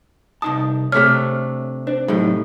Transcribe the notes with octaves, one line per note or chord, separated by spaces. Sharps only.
C2 D#4 A5 D#6
C3 A3 D4 C#5 F6 B6
D4 C5
A2 F#3 D#4 G4